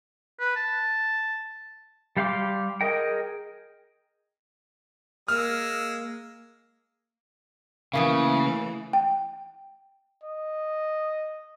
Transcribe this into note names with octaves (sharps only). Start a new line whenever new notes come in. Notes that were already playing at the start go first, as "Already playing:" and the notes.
B4
A5
G3 G4 F5 C6 D6
G#4 A#4 D#5 G5
G#3 A#3 E6 F6
C#3 E3 A3 A#3 F#4 F5 D#6
G5
D#5